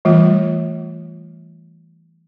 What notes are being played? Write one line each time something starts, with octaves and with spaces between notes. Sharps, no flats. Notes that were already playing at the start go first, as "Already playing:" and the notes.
E3 G3 A3 F4